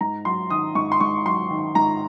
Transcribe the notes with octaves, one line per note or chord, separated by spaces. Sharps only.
G#2 A#5
F#3 C6
D#3 D#6
G#2 C#6
C6
G#2 C#6
F#3 C6
D#3
G#2 A#5